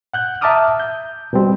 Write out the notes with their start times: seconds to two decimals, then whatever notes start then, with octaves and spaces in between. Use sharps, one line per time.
0.14 F#5 F#6 G6
0.41 E5 A5 A#5 D6 D#6 F6
0.80 G6
1.33 B2 G3 C4